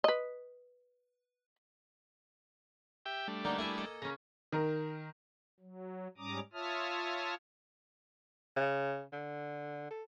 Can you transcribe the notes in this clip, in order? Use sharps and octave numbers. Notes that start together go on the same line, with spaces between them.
B4 D#5
G4 E5 G5
G3 A3 D4
D3 A#3 D#4
E4 G#4 E5 G#5
A4 D#5
C#3 C#4 A#5
D#3 A#4
F#3
G#2 G3 C#4 A#5 D6 D#6
F4 C#5 E5 A5 D#6 F6
C#3
D3
A4